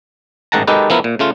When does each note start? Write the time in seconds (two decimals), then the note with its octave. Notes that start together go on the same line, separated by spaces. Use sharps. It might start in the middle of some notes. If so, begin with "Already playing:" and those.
0.52 A1 G#2 D#3 F#5 A5 A#5
0.67 D#3 G#3 D#4 G4 A4 B4
0.90 F3 B3 E4 A#4
1.04 A#2
1.19 C#3 A3 F4